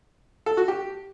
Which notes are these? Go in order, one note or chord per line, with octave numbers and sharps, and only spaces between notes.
A4
F#4
G4